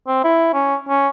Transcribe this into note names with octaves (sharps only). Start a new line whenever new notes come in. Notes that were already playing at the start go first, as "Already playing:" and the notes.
C4
E4
C#4
C#4